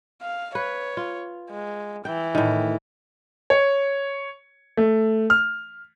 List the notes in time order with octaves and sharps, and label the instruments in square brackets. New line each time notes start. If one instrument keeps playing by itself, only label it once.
[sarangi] F5
[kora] B4 [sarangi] C#5
[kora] F4
[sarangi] G#3
[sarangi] E3 [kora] G5
[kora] A2 D#3
[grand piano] C#5
A3
F6